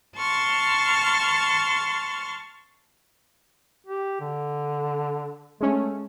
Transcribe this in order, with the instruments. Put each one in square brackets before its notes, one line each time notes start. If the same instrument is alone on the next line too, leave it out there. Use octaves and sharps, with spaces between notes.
[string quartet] A5 C6 C#6 F6
[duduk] G4
D3
[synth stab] G#3 C#4 [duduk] A3